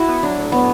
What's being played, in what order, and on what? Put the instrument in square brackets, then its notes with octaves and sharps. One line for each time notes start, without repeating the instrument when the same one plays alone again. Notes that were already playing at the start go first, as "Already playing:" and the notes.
Already playing: [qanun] E4 F#4
[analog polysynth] B3
[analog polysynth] F#3 [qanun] D4
[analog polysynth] A2
[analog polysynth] A2 [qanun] B3